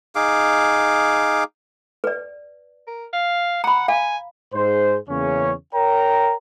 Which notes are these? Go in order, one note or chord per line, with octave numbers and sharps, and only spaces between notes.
D#4 G#4 F5 D6
B4 D5
A#4
F5
F#5 A#5 B5
F5 G#5
G#2 G#4 C5
E2 C#3 A#3 C#4 C#5
A#4 C#5 G5 A#5